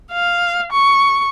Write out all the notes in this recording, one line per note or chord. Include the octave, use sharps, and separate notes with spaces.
F5
C#6